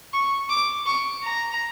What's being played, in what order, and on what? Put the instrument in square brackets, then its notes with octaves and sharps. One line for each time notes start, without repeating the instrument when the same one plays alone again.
[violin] C#6
D6
C#6
A#5